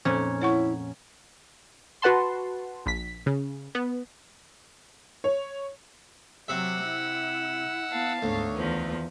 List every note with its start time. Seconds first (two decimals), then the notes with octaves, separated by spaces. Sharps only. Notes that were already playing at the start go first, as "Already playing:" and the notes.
0.05 F2 A#2 C#4 C5
0.42 E4 C#5 F#5 C#6
2.02 F#4 B4 F#5 A5 C6
2.86 A#1 B6
3.26 C#3
3.75 B3
5.24 C#5
6.48 C3 F#3 E5 F#5 E6
6.85 E4
7.91 B3 F5 A5
8.22 D2 G#2 C#5
8.53 E2 D#3 F3 B4